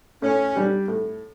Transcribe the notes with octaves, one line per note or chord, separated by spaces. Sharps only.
A2 C#4
G3 D4 G4
A2